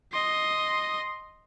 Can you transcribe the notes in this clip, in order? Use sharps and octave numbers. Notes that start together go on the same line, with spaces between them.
D#5 C6